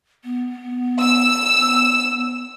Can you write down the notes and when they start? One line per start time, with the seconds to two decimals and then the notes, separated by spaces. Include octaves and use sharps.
0.24 B3
1.00 E6